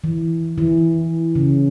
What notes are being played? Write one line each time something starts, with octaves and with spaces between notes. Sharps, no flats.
E3
E3
C#3